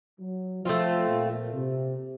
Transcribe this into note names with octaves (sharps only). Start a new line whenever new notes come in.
F#3
F3 A3 C4 F4
A#2
C3